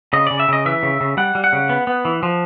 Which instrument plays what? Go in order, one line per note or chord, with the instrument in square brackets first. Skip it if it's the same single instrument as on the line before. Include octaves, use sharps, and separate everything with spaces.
[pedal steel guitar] C#3 D#5
C#3 D5
E5
C#3 D#5
E3 E5
C#3
C#3
G3 F#5
G3
F#5
C#3
B3
B3
E3
F3